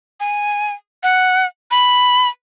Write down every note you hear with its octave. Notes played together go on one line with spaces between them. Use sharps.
G#5
F#5
B5